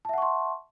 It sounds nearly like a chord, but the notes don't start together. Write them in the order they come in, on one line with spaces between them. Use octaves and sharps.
A5 E5 F#5 C#6 C6